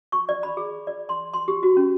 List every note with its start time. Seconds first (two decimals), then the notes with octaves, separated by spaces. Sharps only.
0.12 C#6
0.29 D5
0.43 B5
0.57 G#4
0.87 D5
1.09 C6
1.34 C6
1.48 G4
1.63 F#4
1.77 C#4